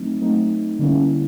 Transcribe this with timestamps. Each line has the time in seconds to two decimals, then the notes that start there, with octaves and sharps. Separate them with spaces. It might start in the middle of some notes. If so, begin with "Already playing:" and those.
Already playing: F#3 A3 C4 D#4
0.22 F#3 A3 C4 D#4
0.79 D3 G3 A#3 C#4 E4